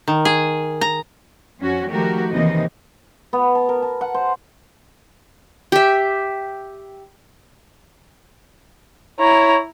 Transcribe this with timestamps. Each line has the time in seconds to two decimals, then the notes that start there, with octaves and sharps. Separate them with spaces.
0.08 D#3
0.25 G#4
0.81 A#5
1.60 F2 C#4 F#4
1.89 D#3 F3 A3 F#4 G4 A#4
2.32 D#2 C3 E3 A#3 D#4 D#5
3.33 B3
3.55 A5
3.69 A#4
3.82 A5
4.01 F#5
4.14 C5
5.72 G4 E5
9.19 E4 C#5 A#5